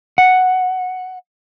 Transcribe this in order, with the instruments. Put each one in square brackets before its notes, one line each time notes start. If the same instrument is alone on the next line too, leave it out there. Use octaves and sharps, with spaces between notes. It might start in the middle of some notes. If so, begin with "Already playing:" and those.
[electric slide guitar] F#5